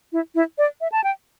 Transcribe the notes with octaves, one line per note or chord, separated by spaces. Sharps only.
E4
E4
D5
E5
A5
G5